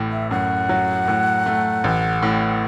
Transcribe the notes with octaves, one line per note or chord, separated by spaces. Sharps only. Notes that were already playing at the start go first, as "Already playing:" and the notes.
Already playing: A1 A2
E5
F#2 F#5
F#3
A2
A3
A1
A2